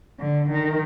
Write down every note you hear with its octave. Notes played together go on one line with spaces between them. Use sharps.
D3
D#3